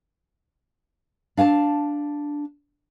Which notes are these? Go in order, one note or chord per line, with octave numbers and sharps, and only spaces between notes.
D4 F5 G#5 A5